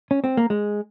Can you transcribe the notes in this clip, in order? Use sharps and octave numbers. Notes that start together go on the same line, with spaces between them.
C#4
C4
A#3
G#3